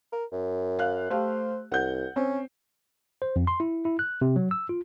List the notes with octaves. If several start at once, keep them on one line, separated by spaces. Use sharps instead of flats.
A#4
F#2
F5 F#6
A3 G4 C5 F5
C2 F#5 G6
C4 C#4
C5
F2
C6
E4
E4
F#6
C3
F#3
E6
F4